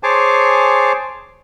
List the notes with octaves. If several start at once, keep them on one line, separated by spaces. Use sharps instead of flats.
G#4 C5 C#5 G#5 A5 D6